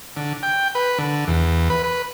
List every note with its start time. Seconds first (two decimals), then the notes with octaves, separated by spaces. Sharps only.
0.17 D3
0.43 G5
0.75 B4
0.98 D3
1.28 E2
1.70 B4
1.84 B4